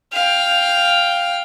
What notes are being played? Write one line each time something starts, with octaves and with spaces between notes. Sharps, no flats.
F5 G5